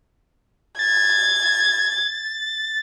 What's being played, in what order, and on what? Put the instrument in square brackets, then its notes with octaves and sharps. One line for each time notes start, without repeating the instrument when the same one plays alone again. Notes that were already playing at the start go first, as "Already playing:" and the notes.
[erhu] G#6 [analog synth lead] A6